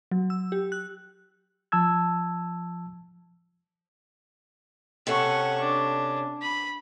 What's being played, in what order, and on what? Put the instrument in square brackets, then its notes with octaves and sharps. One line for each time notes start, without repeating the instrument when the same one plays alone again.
[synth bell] F#3
E6
G4
F#6
[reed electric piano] F3 A5 E6 G#6
[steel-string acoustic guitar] C3 C#4 A4 [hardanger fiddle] F#5 C#6
[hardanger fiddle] D4
B5